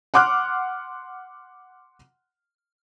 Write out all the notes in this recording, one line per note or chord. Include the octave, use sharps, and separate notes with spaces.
F#5 C6 D6 F6 F#6